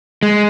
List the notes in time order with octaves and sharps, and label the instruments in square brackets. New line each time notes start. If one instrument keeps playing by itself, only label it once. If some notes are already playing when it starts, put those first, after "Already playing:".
[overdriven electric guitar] G#3